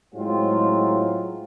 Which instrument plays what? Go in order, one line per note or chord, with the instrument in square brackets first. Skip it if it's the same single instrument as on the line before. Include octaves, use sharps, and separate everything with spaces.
[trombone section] A2 F#3 G#3 C4 D#4 F4